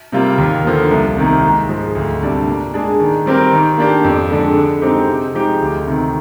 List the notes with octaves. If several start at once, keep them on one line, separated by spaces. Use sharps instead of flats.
C3 G3 A#3 F4
D#2
D3 F3 A#3
C2
C3 D#3 A#3
G#2
F3 G#3
D2
C3 G3 D4
A#2
G#3 D4 G#4
D#3
G3 C4 G4 A#4
D#3
A#3 D4 G4
F2
D3 G#3 D4
D3
G#3 C4 D#4 G4
C3
F3 G#3 D#4 G4
D2
C3 D#3